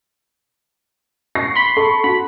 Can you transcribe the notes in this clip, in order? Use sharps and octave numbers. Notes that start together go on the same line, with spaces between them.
C#6 A#6 C7
B5 C6
A4 C#6
F#4 B5